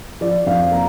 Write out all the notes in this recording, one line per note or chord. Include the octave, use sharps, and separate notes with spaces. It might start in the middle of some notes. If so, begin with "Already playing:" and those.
F3 D5
F2 F5
A#3 A#5